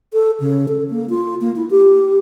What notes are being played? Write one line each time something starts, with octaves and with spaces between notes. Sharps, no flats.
A4
C#3
A4
A#3
F4
A#3
E4
G4